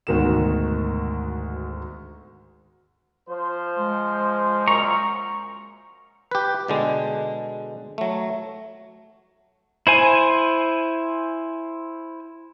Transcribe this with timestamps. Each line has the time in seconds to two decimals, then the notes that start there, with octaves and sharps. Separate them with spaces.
0.07 D2 G#2 B2 D#3 F#4 E7
3.29 F3 C5
3.78 G#3
4.68 F#2 A#2 A#5 C#6
6.31 G4 B4
6.68 B2 D3 G#3
7.98 F#3 A3
9.87 E4 C5 G#5